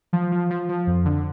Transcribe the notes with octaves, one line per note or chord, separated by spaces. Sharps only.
F3
F3
F3
F3
F2
D3